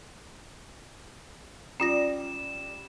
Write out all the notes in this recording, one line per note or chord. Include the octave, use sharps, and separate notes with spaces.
G3 C#4 F4 A#6 E7